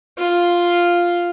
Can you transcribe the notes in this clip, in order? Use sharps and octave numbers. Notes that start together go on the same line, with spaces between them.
F4